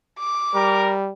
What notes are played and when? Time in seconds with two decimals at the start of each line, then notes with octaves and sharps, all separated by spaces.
0.19 D6
0.55 G3 A#4